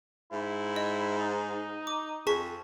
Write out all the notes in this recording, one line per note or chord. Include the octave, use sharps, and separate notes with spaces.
G#2 E4
D#5
D#4
D6
F2 G#4 A5 C#6 B6